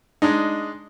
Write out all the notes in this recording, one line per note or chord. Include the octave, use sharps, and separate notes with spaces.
G#3 D4 D#4